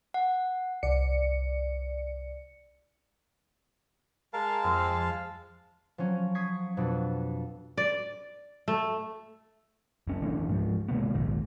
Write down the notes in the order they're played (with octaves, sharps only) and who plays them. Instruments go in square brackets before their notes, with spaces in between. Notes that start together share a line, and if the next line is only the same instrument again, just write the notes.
[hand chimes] F#5
[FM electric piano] C2 D5 C#7
[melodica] G#3 F5 A5 [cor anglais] A#4
[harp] F2 [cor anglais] C4
[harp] F3 F#3 C#4
C#6 D#6 G#6 B6 C7
F2 B2 D4 B4
[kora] D5
A3
[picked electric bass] F#1 C#4
F#1 E3 A3 D4
G#2 F3
C3 G#3 A#3 B3
A#1 D#2 G#2